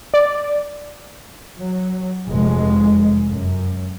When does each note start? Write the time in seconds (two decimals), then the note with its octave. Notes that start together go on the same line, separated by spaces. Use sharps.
0.14 D5
1.59 F#3
2.27 F1 F2 G#3
3.31 F#2